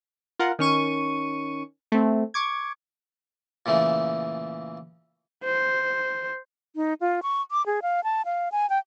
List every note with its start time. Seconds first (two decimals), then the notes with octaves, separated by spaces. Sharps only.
0.39 F4 A#4 F#5
0.59 D#3 C#4 C#6 D#7
1.92 A3 C4
2.34 C#6 D6 G#6
3.66 A#2 C#3 E3 A3
5.44 C5
6.76 D#4
7.01 F4
7.23 C#6
7.51 D6
7.66 G#4
7.82 F5
8.04 A5
8.25 F5
8.52 G#5
8.70 G5